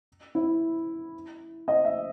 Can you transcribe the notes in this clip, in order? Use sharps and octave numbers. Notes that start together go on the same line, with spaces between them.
E4
D#5
E5